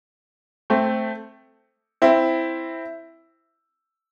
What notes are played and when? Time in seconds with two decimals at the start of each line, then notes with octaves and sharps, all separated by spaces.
0.70 A3 C4
2.02 C4 E4